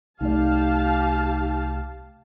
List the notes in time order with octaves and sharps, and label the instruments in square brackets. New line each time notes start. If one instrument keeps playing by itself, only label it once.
[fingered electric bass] C2 A3 [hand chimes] D#4 D5 [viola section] G4 F5 A5